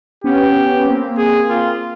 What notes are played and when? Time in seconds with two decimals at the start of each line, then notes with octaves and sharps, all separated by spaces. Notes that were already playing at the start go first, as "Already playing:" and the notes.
0.24 B3 C#4 G4
0.87 A#3 C4
1.18 G#4
1.49 A#3 C4 F4